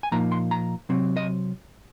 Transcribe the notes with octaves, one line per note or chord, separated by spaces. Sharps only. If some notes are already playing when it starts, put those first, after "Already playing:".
G#5
A#2 F3 A#3 D#4 A#5
C6
A#5
C3 F#3 C4
D#5